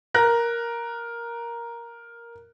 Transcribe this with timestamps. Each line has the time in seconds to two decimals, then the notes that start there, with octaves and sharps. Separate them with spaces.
0.14 A#4 F#6 A#6